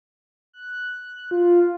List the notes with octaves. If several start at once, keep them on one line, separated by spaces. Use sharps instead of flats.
F#6
F4